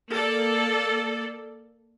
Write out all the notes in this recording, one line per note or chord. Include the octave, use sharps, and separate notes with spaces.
A#3 A4 D5